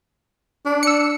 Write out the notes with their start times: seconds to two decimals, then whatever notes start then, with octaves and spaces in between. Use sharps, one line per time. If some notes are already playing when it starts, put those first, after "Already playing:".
0.66 D4
0.83 E6 C#7